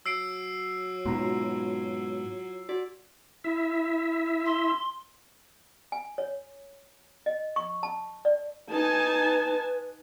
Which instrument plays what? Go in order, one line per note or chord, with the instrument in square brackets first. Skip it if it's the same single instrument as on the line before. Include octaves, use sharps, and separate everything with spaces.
[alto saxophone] F#3 [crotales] E6 C7 D7
[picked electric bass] G#2 B2 [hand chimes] F4 A#5 C6
[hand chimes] F#4 [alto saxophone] D5
[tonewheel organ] E4 E5
[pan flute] C6
[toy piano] G#5
C#5
D#5
C#6
A5
D5
[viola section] D#4 G#5 A5 [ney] B4